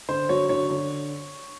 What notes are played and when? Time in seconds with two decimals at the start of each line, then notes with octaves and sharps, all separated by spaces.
0.09 D3 C5
0.29 F#3 C#5
0.49 D3 C#5
0.70 D3